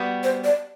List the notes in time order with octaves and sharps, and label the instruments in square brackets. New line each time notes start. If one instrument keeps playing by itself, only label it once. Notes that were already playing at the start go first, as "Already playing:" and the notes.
Already playing: [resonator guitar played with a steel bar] G3 B3 F#4
[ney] C5
D5